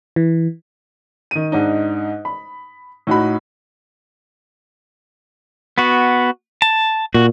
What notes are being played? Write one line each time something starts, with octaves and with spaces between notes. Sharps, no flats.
E3
D#3 D#7
G#2 D4 D#4
B5
A2 D#4 F#4 B5
B3 F#4
A5
A#2 F#4